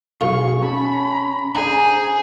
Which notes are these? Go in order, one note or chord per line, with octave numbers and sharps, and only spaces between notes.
B1 F4 G#4 C#6
C#4 A5 B5
D4 G#4 C5 G#5 A#5